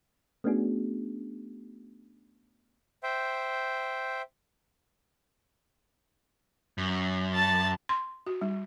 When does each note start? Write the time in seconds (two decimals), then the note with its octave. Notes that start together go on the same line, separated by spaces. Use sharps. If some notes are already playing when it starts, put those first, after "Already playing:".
0.44 A3 B3 C#4 D4 F#4 G#4
3.03 C5 E5 G5
6.78 F#2
7.34 A5 A6
7.89 C6
8.27 F#4
8.41 G3